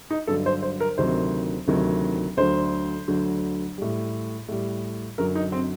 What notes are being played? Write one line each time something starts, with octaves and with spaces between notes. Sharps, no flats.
D#4
G2 D3 F#3 A4
C5
C5
A#4
D2 C3 D#3 F#3 C5
D2 C3 D#3 F#3
D2 D3 F#3 C5
D2 D3 F#3
A2 G3
A2 G3
F#2 D3 F#3 A#4
D#4
C4